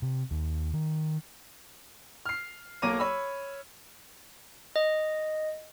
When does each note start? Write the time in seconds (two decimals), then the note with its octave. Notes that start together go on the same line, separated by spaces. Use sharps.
0.02 C3
0.31 D#2
0.73 D#3
2.26 F6 C7
2.82 B1 A#3 C#5 A#5 D6 D#7
2.99 C#5 B5 E6
4.76 D#5